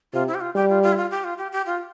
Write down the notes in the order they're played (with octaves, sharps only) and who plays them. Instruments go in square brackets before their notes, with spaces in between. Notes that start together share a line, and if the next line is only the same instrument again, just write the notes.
[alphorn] C3 [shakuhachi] F4
[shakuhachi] E4
G4
F4
[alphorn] G3 [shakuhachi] G4
[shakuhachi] F4
F4
E4
F4
G4
F4
G4
G4
F4